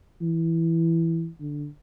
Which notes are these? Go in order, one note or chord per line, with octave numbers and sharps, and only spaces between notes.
E3
D3